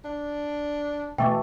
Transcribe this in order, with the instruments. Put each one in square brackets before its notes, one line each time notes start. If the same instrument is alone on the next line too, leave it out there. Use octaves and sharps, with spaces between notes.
[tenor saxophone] D4
[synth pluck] B2 E3 A3 [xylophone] G5 C#6 D6